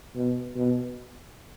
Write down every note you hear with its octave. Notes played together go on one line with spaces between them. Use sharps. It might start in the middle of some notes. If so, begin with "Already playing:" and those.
B2
B2